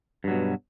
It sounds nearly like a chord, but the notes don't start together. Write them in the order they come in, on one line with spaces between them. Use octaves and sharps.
G2 F#3 B2